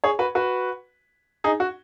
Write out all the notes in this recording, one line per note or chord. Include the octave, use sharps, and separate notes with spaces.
G#4 C#5
F#4 B4
F#4 B4
D#4 G#4
F#4